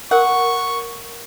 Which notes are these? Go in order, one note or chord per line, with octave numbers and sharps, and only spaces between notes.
A#4 F#5 C#6